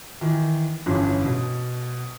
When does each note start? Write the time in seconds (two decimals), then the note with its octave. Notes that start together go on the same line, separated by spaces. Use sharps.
0.21 D#3 E3
0.86 G1 F2 C#3 E3
1.24 B2